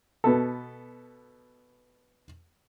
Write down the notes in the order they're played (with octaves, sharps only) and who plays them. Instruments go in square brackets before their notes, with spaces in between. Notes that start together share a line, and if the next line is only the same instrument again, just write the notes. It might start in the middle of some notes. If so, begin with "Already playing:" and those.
[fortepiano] B2 B3 A4